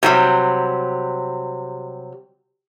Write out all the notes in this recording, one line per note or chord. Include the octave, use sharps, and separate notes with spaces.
C3 F#3 G3